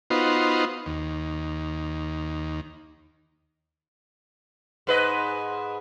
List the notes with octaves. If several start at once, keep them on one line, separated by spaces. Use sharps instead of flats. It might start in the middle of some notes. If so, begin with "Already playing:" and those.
B3 D#4 F4 F#4 C5
D#2
G#2 B4 D#5